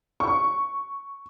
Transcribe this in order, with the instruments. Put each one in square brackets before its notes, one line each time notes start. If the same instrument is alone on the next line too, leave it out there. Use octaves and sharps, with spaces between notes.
[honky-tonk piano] C#6